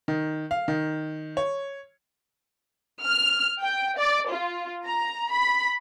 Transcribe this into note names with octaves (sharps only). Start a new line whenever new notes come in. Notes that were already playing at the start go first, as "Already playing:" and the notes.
D#3
F5
D#3
C#5
F6
G5
D5
F4
A#5
B5